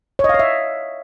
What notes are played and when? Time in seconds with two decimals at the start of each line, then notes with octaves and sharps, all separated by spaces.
0.19 C#5
0.24 D#5
0.29 F5
0.34 C#5
0.39 E5